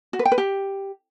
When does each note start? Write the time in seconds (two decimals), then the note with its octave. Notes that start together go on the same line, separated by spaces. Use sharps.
0.13 F#4
0.19 B4
0.25 G5
0.32 B4
0.38 G4